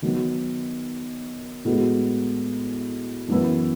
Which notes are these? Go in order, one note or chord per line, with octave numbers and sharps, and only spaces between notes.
D#3 F#3 B3 F#4
A2 G#3 B3 F#4
F#2 E3 B3 E4 B4